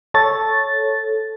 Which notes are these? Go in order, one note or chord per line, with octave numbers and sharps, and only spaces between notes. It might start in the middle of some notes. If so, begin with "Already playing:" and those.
A4 C#5 A6